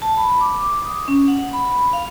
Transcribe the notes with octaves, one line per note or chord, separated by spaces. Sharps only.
A5
B5
D6
D#6
C#4
F#5
B5
F5